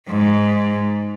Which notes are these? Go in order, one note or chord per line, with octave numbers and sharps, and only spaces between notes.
G#2